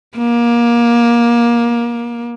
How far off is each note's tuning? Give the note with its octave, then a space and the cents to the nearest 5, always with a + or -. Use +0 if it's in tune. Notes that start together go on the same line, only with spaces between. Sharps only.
A#3 +20